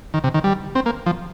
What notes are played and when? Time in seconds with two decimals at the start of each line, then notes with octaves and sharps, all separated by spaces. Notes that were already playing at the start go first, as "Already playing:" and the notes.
0.14 D#3
0.24 C3
0.34 D#3
0.44 G3
0.75 C4
0.86 A#3
1.06 F3